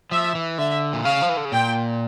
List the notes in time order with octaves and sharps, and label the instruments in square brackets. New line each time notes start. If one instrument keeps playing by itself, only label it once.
[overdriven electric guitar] F3 [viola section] E5
[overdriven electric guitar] E3
[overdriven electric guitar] D3 [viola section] E5
[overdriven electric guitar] A#2
[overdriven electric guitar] C#3 [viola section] F5
[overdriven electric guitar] F3
E3
D3
C#3
[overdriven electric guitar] A#2 [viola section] G5